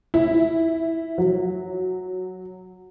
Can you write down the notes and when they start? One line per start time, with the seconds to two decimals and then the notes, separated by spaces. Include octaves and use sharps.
0.14 E4
1.18 F#3